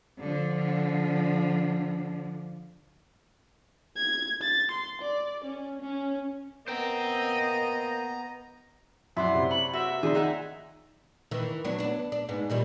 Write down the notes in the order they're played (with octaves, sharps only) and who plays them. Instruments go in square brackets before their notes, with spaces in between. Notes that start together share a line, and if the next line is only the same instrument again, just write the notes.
[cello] D3 F3
[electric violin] G#6
A6
C6
D5
C#4
C#4
[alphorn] A#3 [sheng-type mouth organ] B3 A#5 [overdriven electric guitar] C5 G5 [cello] D#5
[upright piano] F#2 [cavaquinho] E4 D5 F#5 [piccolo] C6
[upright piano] C3
[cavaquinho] C#5 B5 [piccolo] F#7
[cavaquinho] F#4 A#4 C5 [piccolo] E5
[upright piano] D#3 D5 [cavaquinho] G#4 C6
[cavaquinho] D#4 F#5 G#5
[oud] D#3 E3
F#3 B3 D4
B3 D4
D4
G#2 B3
A#2 D#3 G3